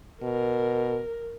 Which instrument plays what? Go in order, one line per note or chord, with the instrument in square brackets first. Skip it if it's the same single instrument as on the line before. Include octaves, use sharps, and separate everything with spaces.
[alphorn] B2 [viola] A#4